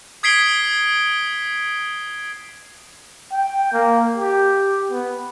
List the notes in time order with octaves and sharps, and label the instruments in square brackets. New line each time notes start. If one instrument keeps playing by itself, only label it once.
[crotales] D#6 G#6 B6 C7 D7 G7
[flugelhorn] G5
A#3
G4
B3